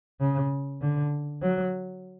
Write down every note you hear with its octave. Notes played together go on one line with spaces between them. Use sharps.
C#3
D3
F#3